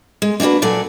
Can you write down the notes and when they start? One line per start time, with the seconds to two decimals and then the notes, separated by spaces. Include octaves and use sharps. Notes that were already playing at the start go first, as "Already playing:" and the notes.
0.22 G#3
0.40 A#3 D4 D#4 F#4 B4
0.62 A#2 F#3 A4 D5 G#5